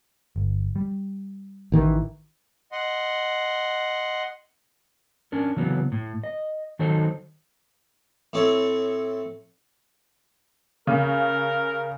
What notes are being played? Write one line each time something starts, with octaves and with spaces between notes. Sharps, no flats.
G1
G3
A1 D#3 E3
D#5 F#5 C6
C#4 D4 A#4
C#3 E3 F#3 B3
A2
D#5
D#3 F#3 D#4 A4 C5
A2 C4 A4 C#5
C#3 A#4